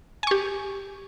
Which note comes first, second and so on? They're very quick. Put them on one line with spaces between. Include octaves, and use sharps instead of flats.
G#5 C#6 G4